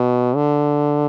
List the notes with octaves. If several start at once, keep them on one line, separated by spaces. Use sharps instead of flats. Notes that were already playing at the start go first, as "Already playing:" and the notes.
Already playing: B2
D3